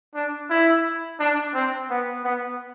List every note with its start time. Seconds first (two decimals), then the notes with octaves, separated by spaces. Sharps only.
0.15 D4
0.50 E4
1.19 D4
1.54 C4
1.90 B3
2.24 B3